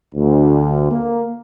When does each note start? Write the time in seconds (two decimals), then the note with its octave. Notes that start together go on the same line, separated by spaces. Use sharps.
0.14 D2
0.90 A#3